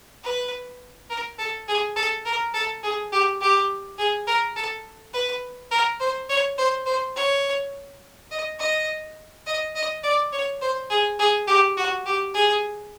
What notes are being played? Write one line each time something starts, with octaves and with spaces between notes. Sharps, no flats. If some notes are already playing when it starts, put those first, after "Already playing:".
B4
A#4
A4
G#4
A4
A#4
A4
G#4
G4
G4
G#4
A#4
A4
B4
A#4
C5
C#5
C5
C5
C#5
D#5
D#5
D#5
D#5
D5
C#5
C5
G#4
G#4
G4
F#4
G4
G#4